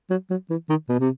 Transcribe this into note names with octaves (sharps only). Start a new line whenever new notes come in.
F#3
F#3
E3
D#3
B2
C3